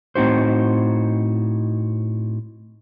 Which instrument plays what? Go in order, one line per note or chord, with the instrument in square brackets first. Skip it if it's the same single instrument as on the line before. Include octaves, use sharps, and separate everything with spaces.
[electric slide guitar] A2 C4 D#4 F#4 C5